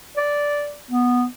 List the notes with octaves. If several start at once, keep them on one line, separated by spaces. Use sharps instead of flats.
D5
B3